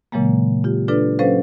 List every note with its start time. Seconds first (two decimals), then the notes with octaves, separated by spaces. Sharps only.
0.12 A#2 C#3 E3 F#3 G#3 A#3
0.64 F4 G4
0.88 D4 F4 A4 B4 D5
1.19 F#3 C#4 A4 B4 C5 F5